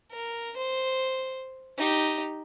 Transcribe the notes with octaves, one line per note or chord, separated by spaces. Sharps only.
A#4
C5
D#4 G4